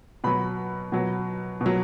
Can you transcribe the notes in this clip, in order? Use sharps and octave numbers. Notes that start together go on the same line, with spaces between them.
B2 F#3 B5
B2 F#3
B2
F#3